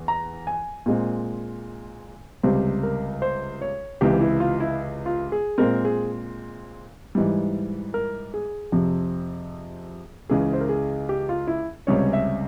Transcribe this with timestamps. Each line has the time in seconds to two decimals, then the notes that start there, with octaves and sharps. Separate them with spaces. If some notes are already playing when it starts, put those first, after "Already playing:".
Already playing: E2
0.08 A#5
0.47 G#5
0.86 A#2 G#3 C4
2.43 C#2 C3 G3 C5
2.83 A#4
3.22 C5
3.61 C#5
4.01 C#2 C3 E3 G4
4.21 E4
4.40 F4
4.60 E4
5.06 F4
5.32 G#4
5.58 A#2 G#3 C4 A#4
5.85 G#4
7.15 G#2 E3 G3
7.94 A#4
8.34 G#4
8.72 F2 C3 F3
10.29 C#2 C#3 E3 G#4
10.53 C5
10.61 A#4
10.69 G#4
11.09 G4
11.29 F4
11.47 E4
11.87 C#2 C3 G3 C#4 C#5
12.13 E5